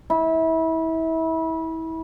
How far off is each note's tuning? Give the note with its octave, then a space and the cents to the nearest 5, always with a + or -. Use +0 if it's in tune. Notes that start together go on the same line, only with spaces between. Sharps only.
E4 -30